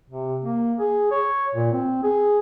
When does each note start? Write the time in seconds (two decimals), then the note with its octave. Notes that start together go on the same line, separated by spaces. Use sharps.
0.10 C3
0.43 A#3
0.79 G#4
1.11 C#5
1.55 A#2
1.73 C4
2.04 G#4